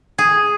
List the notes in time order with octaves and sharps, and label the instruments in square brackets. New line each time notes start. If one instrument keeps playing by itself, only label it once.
[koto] G#4